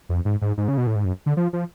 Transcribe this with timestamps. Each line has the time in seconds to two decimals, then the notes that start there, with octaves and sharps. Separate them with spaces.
0.09 F2
0.25 G#2
0.41 G#2
0.57 G#2
0.68 C#3
0.78 B2
0.87 A2
0.96 G#2
1.05 F#2
1.26 D3
1.37 F3
1.53 F3